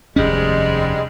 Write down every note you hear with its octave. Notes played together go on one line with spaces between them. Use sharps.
F1 D#2 G#2 G3 G#3 C#4